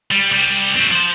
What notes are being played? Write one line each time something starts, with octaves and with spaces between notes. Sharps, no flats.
G3
C2 G3
C4 F#4
F3 C5